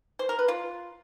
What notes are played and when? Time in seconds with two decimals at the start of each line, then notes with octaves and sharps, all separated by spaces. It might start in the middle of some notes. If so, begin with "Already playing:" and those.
0.19 C5
0.29 A#4
0.39 B4
0.48 F4